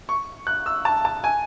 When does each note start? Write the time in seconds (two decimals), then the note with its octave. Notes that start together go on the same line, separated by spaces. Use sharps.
0.09 C#6
0.47 F#6
0.66 E6
0.85 A5
1.05 A5
1.24 G#5